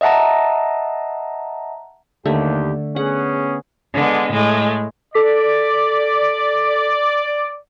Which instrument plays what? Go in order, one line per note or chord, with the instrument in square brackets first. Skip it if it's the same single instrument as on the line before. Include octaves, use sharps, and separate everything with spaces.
[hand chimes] D#5 E5 F#5 A5 A#5
[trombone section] D#2 G4 [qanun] D3 A3
[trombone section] B3 C#4 G#4 [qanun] F#5
[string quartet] D3 G#3 B3
A2 G#3 A3
[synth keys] A4 D6 B6 [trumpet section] D5